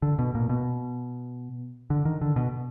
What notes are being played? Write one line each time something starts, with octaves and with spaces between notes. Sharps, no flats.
D3
B2
A#2
B2
D3
D#3
D3
B2